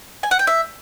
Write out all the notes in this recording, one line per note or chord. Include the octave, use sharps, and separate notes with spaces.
G#5
F#5
G5
E5